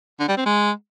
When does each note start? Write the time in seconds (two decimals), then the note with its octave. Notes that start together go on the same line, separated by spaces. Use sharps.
0.19 D3
0.28 G3
0.37 C4
0.46 G#3